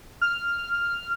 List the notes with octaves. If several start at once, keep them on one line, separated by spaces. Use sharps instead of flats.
F6